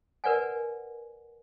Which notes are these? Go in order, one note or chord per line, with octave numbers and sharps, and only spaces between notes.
A#4 B4 D5 F#5 G#5